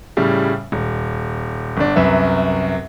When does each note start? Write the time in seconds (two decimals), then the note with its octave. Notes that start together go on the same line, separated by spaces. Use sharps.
0.17 A2 C#3 G3
0.72 D#1
1.77 G1 D4
1.96 C2 F#2 B4 E5